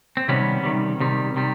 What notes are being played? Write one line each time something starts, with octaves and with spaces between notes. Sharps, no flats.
C4
C3 D#3 G3 B3 C#4
C3 D#3 G3
C3 D#3 G3
C3 D#3 G3